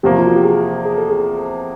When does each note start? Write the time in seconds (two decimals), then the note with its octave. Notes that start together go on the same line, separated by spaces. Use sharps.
0.03 E2 C3 F3 A#3 G4
0.19 F4
0.27 F#4
0.36 G4
0.44 G#4
0.85 G#4
0.98 A4
1.10 G#4